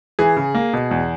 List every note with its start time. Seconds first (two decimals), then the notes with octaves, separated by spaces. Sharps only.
0.19 E3 G#4
0.37 C#3
0.55 A#3
0.73 B2
0.91 E2